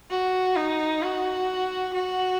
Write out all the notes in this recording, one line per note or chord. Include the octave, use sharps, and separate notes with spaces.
F#4
D#4
F#4
F#4